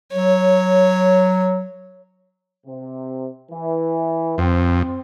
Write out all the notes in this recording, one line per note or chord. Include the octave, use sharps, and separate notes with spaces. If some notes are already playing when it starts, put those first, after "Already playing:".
F#3 C#5
C3
E3
F2 C4